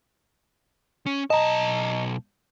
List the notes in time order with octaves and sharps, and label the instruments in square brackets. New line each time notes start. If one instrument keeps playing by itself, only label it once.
[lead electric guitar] C#4
[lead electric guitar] B1 A5 [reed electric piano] D#5 A#5